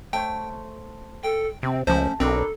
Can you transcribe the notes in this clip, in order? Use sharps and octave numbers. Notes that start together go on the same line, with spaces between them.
A3 C5 C#5 G5
A4 G5
C3 C4
C#2 F3 A3 C#4 C5
B1 B2 C4 D4 A4 A#4